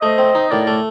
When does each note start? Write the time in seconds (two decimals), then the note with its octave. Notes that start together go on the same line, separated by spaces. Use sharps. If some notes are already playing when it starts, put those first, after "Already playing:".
0.02 A3 C5 D#5
0.18 C4
0.35 D#4
0.51 A2 A#4 D5
0.67 A3